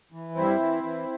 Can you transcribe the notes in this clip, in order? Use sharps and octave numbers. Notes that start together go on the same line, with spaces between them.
E3
G2 C4 E4
E3
E3